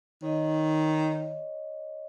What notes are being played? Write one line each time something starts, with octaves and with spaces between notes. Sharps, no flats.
D#3 C#5 D#5